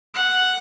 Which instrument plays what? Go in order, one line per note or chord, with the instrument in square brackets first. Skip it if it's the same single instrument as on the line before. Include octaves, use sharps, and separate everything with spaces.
[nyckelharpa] F#5